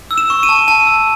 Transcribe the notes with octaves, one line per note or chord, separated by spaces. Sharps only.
E6
E7
C#6
D#7
A5
A5 D#7
E6